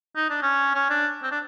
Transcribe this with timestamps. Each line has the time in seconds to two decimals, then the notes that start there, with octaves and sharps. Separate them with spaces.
0.16 D#4
0.30 D4
0.42 C#4
0.75 C#4
0.90 D4
1.23 C4
1.31 D4